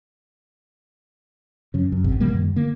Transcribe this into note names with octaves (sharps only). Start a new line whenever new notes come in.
F#2 C#3
F#2
G#1 C#2 C3
B2 D#3 G3 A#3
F#2 D#3 G3
D3 A#3